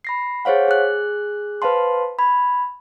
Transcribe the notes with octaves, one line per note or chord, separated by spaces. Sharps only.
B5 A#6 C7
G#4 C5 C#5 F5 F#5
G#4 F#6
B4 C5 F5 A5 C6
B5 G#6